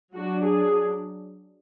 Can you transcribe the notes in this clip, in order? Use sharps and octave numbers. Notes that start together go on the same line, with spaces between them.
F#3 D4 F#4
G#4